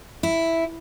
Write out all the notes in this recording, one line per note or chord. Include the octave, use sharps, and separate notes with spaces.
E4